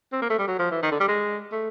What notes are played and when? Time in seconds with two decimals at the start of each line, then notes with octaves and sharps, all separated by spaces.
0.13 C4
0.22 A#3
0.30 A3
0.39 G3
0.48 F#3
0.59 F3
0.71 E3
0.83 D#3
0.91 D3
1.00 G3
1.08 G#3
1.52 A3